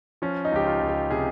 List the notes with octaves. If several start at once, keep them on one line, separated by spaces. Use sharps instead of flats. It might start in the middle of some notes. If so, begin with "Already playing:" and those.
F3 C#4
D#4
C#2 G4
F4
C#2
G4
C3 G#4